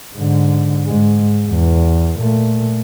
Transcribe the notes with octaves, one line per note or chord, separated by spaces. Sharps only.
G#2 D3
G#2 G#3
E2
A#2 A3